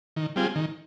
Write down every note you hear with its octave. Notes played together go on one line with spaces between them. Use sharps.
D#3
G3 C4 F4 G#4
D#3